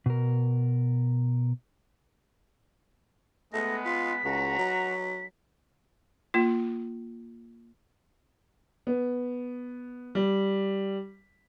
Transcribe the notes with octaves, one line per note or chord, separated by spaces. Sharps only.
B2 A#4
G#3 A3 B3 A#6
F4 B6
C#2 F#4 A#5
F#3
A#3 F4
B3
G3